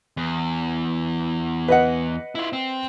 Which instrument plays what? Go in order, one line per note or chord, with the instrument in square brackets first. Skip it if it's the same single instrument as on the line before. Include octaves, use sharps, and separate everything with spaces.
[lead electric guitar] E2
[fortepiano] B4 D#5 F#5
[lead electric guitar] E4 F4
C4